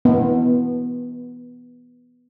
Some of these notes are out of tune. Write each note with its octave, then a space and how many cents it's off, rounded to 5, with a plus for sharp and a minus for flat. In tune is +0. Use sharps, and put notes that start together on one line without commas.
B3 -5